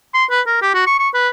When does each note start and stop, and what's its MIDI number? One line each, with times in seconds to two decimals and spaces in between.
0.14 0.25 84
0.31 0.41 71
0.47 0.61 70
0.62 0.74 67
0.74 0.86 66
0.87 0.97 85
0.99 1.09 85
1.14 1.29 71